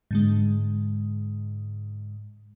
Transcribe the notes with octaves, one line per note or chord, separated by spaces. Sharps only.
G#2 D3 G#3